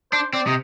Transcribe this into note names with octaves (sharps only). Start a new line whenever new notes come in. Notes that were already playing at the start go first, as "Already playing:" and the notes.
D4 C5
C4 D5
C3 D#5